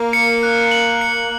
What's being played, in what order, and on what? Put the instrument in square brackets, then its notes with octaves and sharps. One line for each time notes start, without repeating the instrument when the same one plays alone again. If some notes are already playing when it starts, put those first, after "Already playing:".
Already playing: [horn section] A#3
[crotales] C#7
F#6
F#7
C#7